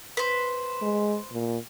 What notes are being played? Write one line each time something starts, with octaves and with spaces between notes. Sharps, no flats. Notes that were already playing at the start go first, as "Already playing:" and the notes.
B4 C5
G#3
A#2